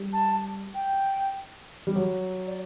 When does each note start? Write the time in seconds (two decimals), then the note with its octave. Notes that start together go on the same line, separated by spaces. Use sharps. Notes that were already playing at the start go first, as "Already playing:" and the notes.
Already playing: G3
0.13 A5
0.74 G5
1.87 G3
1.96 F#3
2.47 D5